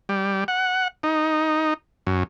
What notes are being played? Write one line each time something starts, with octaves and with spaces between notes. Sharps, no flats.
G3
F#5
D#4
F#2